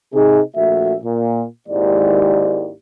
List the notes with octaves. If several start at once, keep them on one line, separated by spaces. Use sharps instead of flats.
C3 D#4 G#4
A#1 A3 F#4 E5
A#2
G#1 D#2 G#2 E4 G4 D5